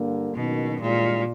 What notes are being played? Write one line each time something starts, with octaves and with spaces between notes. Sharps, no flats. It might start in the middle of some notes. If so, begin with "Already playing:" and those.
Already playing: G2 D3 G3 A#3
F#1 F#2 B2 D#3
G#1 G2 A#2 E3 G#3